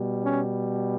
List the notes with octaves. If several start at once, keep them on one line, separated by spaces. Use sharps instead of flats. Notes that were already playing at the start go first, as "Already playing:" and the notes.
Already playing: B2 G3
C#4